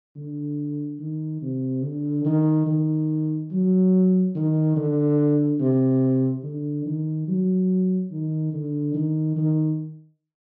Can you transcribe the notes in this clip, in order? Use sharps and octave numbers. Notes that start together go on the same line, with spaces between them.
D3
D#3
C3
D3
D#3
D#3
F#3
D#3
D3
C3
D3
D#3
F#3
D#3
D3
D#3
D#3